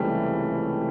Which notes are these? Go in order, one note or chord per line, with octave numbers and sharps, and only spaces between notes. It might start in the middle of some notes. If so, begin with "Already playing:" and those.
Already playing: C#2 C3 E3 G3 A3